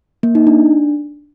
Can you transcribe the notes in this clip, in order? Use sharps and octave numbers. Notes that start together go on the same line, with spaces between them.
A#3
D#4
D4